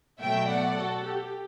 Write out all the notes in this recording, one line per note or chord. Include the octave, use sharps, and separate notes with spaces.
B2 F#3 A3 E5 G5
D5 F#5
F#4 A4
G4